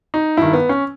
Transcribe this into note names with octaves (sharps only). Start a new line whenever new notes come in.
D#4
G2 D#3 E4
B3
C#4